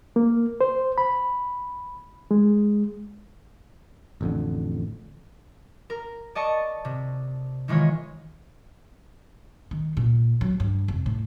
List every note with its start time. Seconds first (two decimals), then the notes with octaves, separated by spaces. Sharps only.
0.16 A#3
0.61 C5
0.98 B5
2.31 G#3
4.21 A1 F2 D3
5.90 A#4
6.35 D5 D#5 A5 C#6
6.85 C3
7.68 D#3 E3 G#3 F4 C#5
9.71 D#3
9.97 A#2
10.41 F#3
10.60 G2
10.88 F1
11.06 A2